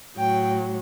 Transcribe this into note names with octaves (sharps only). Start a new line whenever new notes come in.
A2 F#3 G5